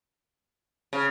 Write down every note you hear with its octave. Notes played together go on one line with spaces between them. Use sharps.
C#3